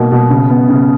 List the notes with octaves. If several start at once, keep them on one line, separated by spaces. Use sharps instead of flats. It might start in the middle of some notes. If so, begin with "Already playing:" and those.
Already playing: B2 A#3 D#4
B2
C#3
B3
C#3